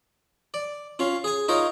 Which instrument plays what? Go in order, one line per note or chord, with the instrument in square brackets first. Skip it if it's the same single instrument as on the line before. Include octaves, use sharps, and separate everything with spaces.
[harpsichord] D5
C#4 F4 F5
G#4 G#5
D#4 F4 A#4 C#5 D#5